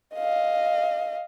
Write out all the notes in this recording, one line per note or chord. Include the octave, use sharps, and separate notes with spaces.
D#5 F5